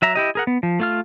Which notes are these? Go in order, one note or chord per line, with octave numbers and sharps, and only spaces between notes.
F#3 E5 A#5
E4 G4 D#5
G#4 A#4 F#5
B3
F3
A3 F4 F6